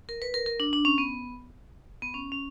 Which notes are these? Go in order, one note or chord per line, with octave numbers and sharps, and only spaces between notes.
A#4
B4
A#4
A#4
D4
D4
C#4
B3
B3
C#4
C#4